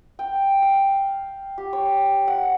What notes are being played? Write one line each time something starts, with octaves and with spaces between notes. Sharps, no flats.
G5
F5
G4
C#5
F#5